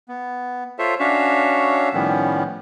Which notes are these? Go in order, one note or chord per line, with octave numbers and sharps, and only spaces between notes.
B3
F4 A4 C5 C#5 E5
C#4 D4 F#4 C#5 E5 F5
A2 D#3 F3 G3 B3 C#4